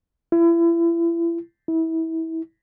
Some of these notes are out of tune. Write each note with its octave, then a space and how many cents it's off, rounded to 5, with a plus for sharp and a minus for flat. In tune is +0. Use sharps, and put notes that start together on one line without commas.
E4 +35
E4 -25